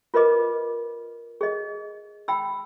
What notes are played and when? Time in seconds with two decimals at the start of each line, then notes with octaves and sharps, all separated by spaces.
0.14 F4 A#4 B4 D#5 D6
1.41 G#4 D#5
2.28 G5 B5 E6